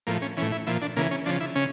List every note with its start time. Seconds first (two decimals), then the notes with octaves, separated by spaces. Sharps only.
0.07 A2 F3 A#3
0.22 C#4
0.37 E3 C#4
0.42 A2
0.52 E4
0.67 A#2 F3 E4
0.82 D4
0.97 C#3 E3 A#3
1.11 C#4
1.26 C#3 F3 D4
1.41 E4
1.55 C#3 C#4